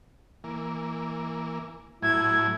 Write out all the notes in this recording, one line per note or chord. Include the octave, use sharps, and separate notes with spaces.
E3 A#3
A2 F#3 E4 G#6